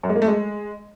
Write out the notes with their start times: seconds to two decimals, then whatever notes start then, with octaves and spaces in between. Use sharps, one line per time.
0.03 F#2
0.10 G#3
0.16 A#3
0.22 A3
0.28 G#3